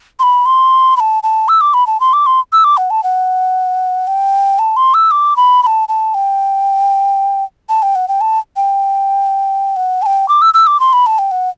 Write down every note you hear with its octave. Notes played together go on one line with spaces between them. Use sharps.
C6
B5
C6
B5
A5
A5
E6
D6
B5
A5
C6
D6
C6
E6
D6
F#5
A5
F#5
G5
A5
C6
E6
D6
B5
B5
A5
A5
G5
A5
G5
F#5
G5
A5
G5
F#5
A5
G5
D6
E6
E6
D6
C6
B5
A5
G5
F#5